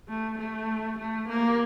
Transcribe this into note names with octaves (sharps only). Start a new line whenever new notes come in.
A3
A3
A3
A#3